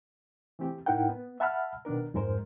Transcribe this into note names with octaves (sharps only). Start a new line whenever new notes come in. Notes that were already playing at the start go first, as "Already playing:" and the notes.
E3 A3 C4 G4
A2 D#4 E4 A#4 F#5 G5
B3
E5 F#5 A5 B5 E6 F6
B2 D#3 B3 D4 A#4
F2 G#2 G#3 A#4 C5